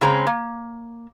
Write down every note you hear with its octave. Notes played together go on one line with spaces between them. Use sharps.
C#3 G#3 C4 C#4 G#4 A#5
A#3